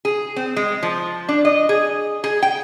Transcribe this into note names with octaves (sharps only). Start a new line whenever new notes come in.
G#4
C4
G#3
F3
D4
D#5
G#4
G#4
G5